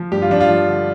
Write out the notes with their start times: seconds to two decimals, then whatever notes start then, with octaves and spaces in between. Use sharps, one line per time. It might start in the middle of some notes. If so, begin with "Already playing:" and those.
Already playing: F3
0.12 G2 G4
0.22 F4
0.30 F3 D4
0.40 F4
0.49 F3
0.67 D3